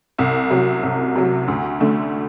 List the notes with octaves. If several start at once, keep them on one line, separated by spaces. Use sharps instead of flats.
C2
C3 F#3
C2
C3 F#3
D2
D3 A3